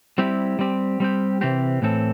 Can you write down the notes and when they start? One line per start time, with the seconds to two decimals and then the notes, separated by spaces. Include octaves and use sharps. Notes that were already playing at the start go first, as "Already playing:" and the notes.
0.18 G3 C4 E4 G4
0.59 G3 C4 G4
1.00 G3 C4 G4
1.41 C3 E3 C4 G4
1.82 A2 E3 C4 A4